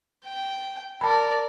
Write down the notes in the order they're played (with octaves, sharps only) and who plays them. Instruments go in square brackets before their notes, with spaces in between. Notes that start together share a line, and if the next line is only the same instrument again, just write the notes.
[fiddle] G5
[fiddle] A#4 D5 [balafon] A5 B5